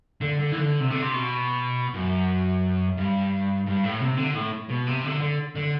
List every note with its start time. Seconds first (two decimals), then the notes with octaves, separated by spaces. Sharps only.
0.21 D3
0.39 D3
0.52 E3
0.56 D3
0.80 C3
0.91 D3
1.01 C3
1.13 B2
1.94 F#2
2.97 G2
3.66 G2
3.83 A2
4.00 C3
4.17 D3
4.34 A2
4.69 B2
4.87 C3
5.03 D3
5.21 D3
5.55 D3